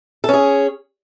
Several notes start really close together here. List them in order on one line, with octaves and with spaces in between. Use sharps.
A4 C#4 G#4